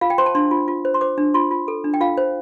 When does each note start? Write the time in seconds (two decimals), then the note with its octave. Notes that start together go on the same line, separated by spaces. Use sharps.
0.01 F4 F5
0.10 G5
0.18 C5 C6
0.26 A5
0.35 D4 C6
0.51 F4
0.68 F4
0.85 C5
0.94 C6
1.01 C5 D6
1.18 D4
1.34 F4 C6
1.51 F4
1.68 A4
1.84 D4
1.94 G5
2.00 F4 F5
2.17 C5